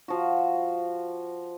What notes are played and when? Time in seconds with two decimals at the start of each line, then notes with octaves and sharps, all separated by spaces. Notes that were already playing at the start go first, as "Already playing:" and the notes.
0.08 F3 F#4